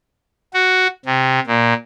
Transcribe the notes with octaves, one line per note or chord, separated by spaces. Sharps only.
F#4
C3
A#2